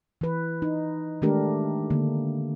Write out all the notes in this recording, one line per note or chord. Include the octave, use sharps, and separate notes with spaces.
E3 B4
D#4
D#3 G#3 A3 D4 G4 A#4
D3 A#3